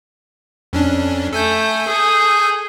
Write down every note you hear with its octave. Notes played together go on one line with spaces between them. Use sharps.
F2 C#4 D4
A3 A4 G#5 G6
G#4